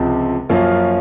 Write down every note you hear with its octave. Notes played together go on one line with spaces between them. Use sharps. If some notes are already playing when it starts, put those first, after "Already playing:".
Already playing: C#2 C3 F3 G#3 C4
F#2 F3 A#3 C#4 F4